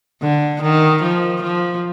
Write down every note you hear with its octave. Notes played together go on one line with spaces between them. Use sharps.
D3
D#3
F3
F3